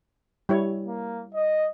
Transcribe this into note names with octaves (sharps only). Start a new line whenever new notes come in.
G3 E4 C#5
A#3
D#5